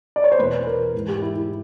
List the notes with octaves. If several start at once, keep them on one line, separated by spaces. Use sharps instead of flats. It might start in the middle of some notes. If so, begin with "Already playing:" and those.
D5
C#5
C5
E2 B2 B4
A#4
G#2 E3
G4
E4
E4